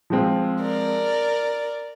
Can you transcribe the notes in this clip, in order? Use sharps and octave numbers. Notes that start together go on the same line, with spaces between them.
F3 G#3 C4 F4
A#4 D5